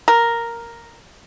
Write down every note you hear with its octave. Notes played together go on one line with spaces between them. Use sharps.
A#4